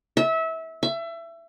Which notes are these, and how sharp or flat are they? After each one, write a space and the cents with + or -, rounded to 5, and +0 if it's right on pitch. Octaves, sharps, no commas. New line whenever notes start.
E5 -25
E5 +25